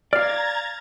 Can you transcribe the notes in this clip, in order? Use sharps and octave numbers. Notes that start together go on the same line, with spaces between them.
D5 F5 A#5 F6 G#6 A6